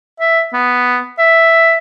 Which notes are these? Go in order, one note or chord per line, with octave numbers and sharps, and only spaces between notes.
E5
B3
E5